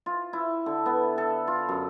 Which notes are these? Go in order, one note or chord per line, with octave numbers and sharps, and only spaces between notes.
F4
E4
D3
B3
A4
F4
F#2